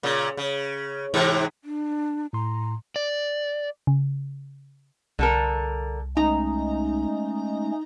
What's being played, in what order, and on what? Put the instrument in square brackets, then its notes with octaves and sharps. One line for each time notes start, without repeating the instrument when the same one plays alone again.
[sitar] A#2 C#3
C#3
G#2 C3 E3
[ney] D4
[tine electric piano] A2 C6 [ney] A#5
[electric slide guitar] D5
[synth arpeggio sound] C#3
[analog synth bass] C2 [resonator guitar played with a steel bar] D3 A4 A#4
[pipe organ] G#3 A3 C#4 [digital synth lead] D#4 [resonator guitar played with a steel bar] A#5